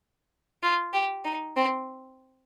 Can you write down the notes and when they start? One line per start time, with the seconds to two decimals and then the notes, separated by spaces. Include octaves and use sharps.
0.63 F4
0.93 G4
1.24 D#4
1.56 C4